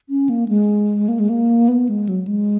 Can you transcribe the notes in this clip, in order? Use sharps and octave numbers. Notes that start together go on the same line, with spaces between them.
C#4
A#3
G#3
A#3
G#3
A#3
B3
G#3
F#3
G#3